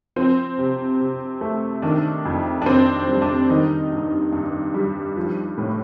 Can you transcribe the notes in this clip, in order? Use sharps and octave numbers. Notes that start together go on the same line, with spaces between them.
F3 C4
C3
C3
A3
D#3 D4
F2
D4
F2 C4
G3
D4
D#3 D#4
G2
G2
G3
F3
A2